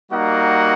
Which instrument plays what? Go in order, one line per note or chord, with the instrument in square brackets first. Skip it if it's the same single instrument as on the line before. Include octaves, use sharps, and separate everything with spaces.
[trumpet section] G3 A#3 D#4 F#4 F#5